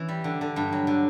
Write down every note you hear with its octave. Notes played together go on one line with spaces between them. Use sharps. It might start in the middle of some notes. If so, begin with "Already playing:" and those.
Already playing: E3 C#4
G3
D3
D3
G2
F#3
D3